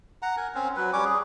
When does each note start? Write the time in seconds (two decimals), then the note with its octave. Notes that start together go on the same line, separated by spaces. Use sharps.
0.22 F#5 A#5
0.37 A#4 G#5
0.55 C4 C#4
0.76 F#3 B4
0.93 G3 C#4 C#5 D6
1.05 G#4